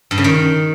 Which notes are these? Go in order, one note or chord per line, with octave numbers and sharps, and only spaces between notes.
G2
C#3
D#3